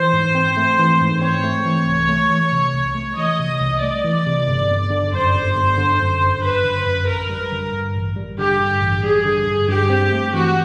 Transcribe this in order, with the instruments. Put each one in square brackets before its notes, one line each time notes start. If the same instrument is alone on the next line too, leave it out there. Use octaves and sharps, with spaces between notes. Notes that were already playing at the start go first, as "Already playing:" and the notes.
Already playing: [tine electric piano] E3 [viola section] C5
[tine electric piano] G#2
C4
A3
E3
G#2
[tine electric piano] C4 [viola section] C#5
[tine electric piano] A3
E3
C2
A3
E3
C3
C2
A3
[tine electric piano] E3 [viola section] D#5
[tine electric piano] C3
C2
[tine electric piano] A3 [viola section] D5
[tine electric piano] E3
C3
G1
G1
D3
[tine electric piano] F#2 [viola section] C5
[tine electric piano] G1
G1
D3
F#2
G1
[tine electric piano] G1 [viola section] B4
[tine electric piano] D3
F#2
[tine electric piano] A1 [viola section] A#4
[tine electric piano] G3
D3
G2
A1
G3
[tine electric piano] D3 [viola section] G4
[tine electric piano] G2
A1
[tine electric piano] G3 [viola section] G#4
[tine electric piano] D3
G2
[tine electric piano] G2 [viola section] G4
[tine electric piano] C4
A3
[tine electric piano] E3 [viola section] F#4